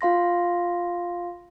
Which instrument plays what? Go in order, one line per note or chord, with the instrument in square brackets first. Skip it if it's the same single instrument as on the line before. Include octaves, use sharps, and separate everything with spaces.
[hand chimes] F4 F5 C6 A#6